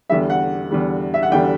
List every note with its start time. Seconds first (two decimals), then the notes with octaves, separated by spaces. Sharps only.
0.10 E2 D3 G3 E5
0.30 F#5
0.71 E2 D3 G3
1.14 E5
1.23 F#5
1.31 E2 D3 G3 G5